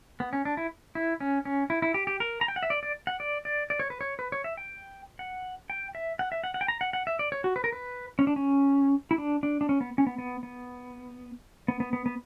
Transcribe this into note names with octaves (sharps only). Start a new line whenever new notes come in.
B3
C#4
D4
E4
E4
C#4
C#4
E4
E4
G4
G4
A#4
A#5
G5
F#5
E5
D5
D5
F#5
D5
D5
D5
C#5
B4
C#5
B4
C#5
E5
G5
F#5
G5
E5
F#5
E5
F#5
F#5
G5
A#5
F#5
F#5
E5
D5
C#5
F#4
B4
A#4
B4
C#4
D4
C#4
E4
D4
D4
D4
C#4
B3
C#4
B3
B3
B3
B3
B3
B3
B3